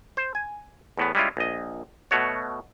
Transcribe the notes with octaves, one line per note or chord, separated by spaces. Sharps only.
C5
G#5
E2 A2 B3
G3 G#3 C#4 E4 F4
A#1 D#5
B2 A3 F#4 C#5